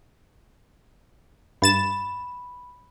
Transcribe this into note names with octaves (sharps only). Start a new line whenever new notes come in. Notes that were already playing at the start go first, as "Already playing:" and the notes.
G2 B5 A6 E7